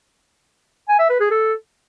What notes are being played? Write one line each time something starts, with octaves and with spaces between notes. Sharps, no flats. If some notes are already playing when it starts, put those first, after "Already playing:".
G#5
E5
B4
G#4
A4